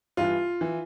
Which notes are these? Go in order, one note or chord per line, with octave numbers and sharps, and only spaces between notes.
G2 E3 F4
E3